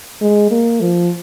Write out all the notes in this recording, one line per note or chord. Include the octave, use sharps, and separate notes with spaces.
G#3
A#3
F3